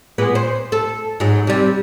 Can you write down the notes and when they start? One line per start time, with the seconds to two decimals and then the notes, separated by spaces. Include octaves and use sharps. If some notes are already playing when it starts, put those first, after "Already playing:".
0.18 A#2 G#3 B3
0.35 C5
0.72 A4
1.20 G#2 F#3
1.47 C3 G3